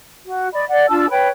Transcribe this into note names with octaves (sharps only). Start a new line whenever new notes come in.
F#4
D5 D#5 B5
D5 F#5
D4 F4 A5 E6
B4 C#5 G5 B5